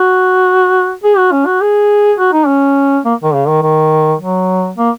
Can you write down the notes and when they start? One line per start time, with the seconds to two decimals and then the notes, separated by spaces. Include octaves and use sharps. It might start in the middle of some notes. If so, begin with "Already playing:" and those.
Already playing: F#4
1.04 G#4
1.18 F#4
1.32 C#4
1.46 F#4
1.61 G#4
2.19 F#4
2.33 D#4
2.47 C#4
3.05 A#3
3.23 D#3
3.34 C#3
3.48 D#3
3.62 D#3
4.19 F#3
4.77 A#3